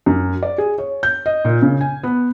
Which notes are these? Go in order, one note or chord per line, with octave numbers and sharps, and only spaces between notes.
F#2
D5
G#4
C#5
G6
D#5
A#2
C#3
G#5
B3